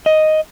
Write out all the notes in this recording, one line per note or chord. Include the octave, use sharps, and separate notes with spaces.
D#5